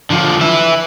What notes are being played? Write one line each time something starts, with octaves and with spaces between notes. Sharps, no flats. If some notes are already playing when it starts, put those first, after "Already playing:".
D3 F3
B4 E5